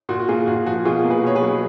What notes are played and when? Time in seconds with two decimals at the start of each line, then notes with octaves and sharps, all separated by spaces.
0.09 A#2 F#4
0.20 F#4
0.28 A#3 F4 G#4
0.47 A#2 F#4
0.66 F3 F#4
0.85 B2 F4 G#4
1.04 A#3
1.10 G#4 B4
1.23 B2 C#5
1.35 G#4 B4
1.42 F#3